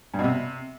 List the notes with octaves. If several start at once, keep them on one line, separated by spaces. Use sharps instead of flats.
G2
B2
C3